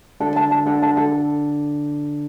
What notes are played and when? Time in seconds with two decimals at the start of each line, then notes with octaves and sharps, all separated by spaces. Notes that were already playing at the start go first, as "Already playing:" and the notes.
0.20 D3 D4 A4
0.36 A5
0.51 A5
0.66 D3 D4 A4
0.82 A5
0.97 A4